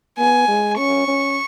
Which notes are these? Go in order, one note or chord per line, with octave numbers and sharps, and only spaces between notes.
B3 G#5
G#3
C#4 C#6
C#4